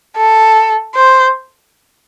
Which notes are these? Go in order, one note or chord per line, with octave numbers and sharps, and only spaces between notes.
A4
C5